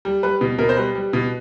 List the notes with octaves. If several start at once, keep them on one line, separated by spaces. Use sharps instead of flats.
G3
G3 B4
B2
B2 A#4
C5
G3 B4
G3
B2